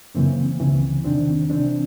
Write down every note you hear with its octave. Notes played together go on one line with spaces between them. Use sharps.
F#2 C#3 E3 A#3 C4
C#2 C#3 E3
E2 C3 D#3 C4 D4
C2 C3 E3 C4 D4